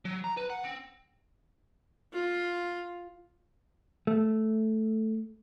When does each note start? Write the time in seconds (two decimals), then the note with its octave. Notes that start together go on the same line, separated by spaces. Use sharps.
0.05 F#3
0.24 A#5
0.37 B4
0.50 F#5
0.64 C4
2.13 F4
4.07 A3